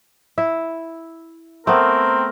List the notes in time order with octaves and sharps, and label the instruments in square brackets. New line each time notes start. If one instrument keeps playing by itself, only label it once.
[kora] E4 E5
[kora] A3 B3 [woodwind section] C4 A#4